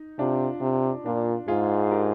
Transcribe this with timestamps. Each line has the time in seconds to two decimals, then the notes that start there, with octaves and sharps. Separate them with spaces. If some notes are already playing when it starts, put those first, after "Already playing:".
Already playing: D#4
0.19 C3 D4 F4
0.61 C3
1.05 A#2 D4 F4
1.48 G#2 F4 G#4
1.91 G4 A#4